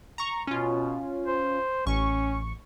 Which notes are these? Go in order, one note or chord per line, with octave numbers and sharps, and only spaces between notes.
A#5 C#6
B2 C#4 F4
C5
A1 C#4 C#6